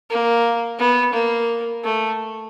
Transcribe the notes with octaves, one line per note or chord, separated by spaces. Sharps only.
A#3
B3
A#3
A3